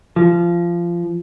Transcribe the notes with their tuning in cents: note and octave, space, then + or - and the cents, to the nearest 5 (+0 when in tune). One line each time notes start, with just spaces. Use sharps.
F3 -20